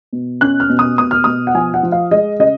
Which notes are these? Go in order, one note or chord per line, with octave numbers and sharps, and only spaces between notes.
B2
C#4 F#6
F6
B2
D#6
B2 D#6
F6
B2 D#6
F#5
F3 G#5
F#5
F3
F5
G#3 D#5
C#3 D#5